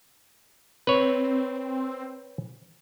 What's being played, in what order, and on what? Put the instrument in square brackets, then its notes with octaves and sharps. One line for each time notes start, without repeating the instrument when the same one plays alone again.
[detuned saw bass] C4 [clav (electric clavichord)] B4 C#5